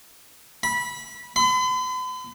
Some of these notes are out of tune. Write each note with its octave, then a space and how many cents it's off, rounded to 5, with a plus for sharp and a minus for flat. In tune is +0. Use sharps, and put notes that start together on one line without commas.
B5 -20
B5 +45